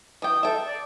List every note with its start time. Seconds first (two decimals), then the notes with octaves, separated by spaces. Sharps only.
0.22 E3 G5 D#6
0.43 A4 E5 G5
0.66 D5